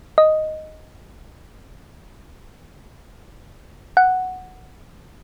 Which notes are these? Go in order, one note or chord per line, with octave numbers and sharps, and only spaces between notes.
D#5
F#5